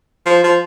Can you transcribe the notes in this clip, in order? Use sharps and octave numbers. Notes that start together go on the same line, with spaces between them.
F3
F3